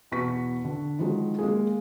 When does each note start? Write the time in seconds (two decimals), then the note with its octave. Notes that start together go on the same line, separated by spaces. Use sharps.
0.11 E2 B2 B3 C#6 B6
0.65 D3
0.99 D#3 F3 F#3 G#3
1.39 G#3 A#3 G#4